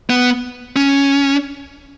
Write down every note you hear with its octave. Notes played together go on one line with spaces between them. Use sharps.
B3
C#4